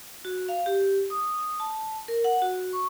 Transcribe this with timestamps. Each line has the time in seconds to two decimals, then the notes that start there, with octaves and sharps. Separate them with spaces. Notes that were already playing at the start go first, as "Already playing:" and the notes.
0.25 F#4
0.49 F5
0.66 G4
1.10 D#6
1.60 A5
2.08 A#4
2.24 F#5
2.42 F#4
2.73 C#6